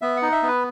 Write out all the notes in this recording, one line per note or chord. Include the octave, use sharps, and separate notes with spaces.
B3 E5
F#5
D#4
E5
B3 B4